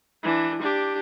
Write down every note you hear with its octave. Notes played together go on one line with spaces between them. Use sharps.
E3 D4
D4 G4